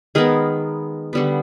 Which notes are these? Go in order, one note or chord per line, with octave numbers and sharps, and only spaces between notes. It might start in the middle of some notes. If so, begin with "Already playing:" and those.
D#3 G#3 B3 G#4 A#4
D3 G3 B3